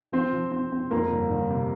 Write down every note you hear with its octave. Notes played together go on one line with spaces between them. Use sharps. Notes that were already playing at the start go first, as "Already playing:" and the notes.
F3 C4 C5
F3
C4
C4
F2 A#3 A#4
G1
G1
C3